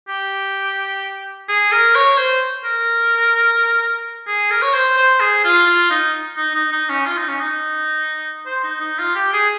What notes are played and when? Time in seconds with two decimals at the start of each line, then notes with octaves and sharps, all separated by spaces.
0.09 G4
1.49 G#4
1.72 A#4
1.95 C#5
2.18 C5
2.64 A#4
4.27 G#4
4.51 A#4
4.62 C#5
4.73 C5
4.97 C5
5.20 G#4
5.44 F4
5.66 F4
5.91 D#4
6.37 D#4
6.54 D#4
6.72 D#4
6.89 C#4
7.06 F4
7.18 D#4
7.29 C#4
7.40 D#4
8.46 C5
8.64 D#4
8.80 D#4
8.99 F4
9.15 G4
9.33 G#4